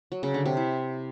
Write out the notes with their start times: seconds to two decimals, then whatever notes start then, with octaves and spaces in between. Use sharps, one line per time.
0.12 F#3
0.23 C#3
0.34 D3
0.46 C3
0.57 E4